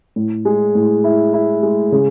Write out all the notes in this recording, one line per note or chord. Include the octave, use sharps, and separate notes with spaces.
A2
G#3
A2
E4
E4
G#3
C#3